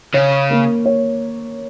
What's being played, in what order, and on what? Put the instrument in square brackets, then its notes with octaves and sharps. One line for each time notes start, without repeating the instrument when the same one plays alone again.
[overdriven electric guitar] C#3 [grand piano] C#5
[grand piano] A#3
C#5